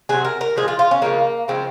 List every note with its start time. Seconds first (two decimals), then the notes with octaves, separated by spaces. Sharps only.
0.09 C3 F#3 G#4
0.25 A#4
0.41 A#4
0.56 A#2 F3 G#3 G#4
0.68 F4
0.79 F4
0.91 C#4
1.02 C#3 F3 G#3 A#3
1.48 C#3 F3 G#3 C4